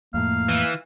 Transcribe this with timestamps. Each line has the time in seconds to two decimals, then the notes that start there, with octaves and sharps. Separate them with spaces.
0.14 F2 A2 A#3 F5
0.49 E3